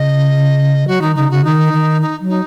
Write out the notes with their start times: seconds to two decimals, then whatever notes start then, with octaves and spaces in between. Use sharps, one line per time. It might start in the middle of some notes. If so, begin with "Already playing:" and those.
Already playing: C#3 D#5
0.87 F#3 F#4
1.02 D#3 D#4
1.16 C#3 D#4
1.30 C#3 F#4
1.44 D#3 D#4
1.73 D#3
2.02 D#4
2.21 F#3
2.29 D#4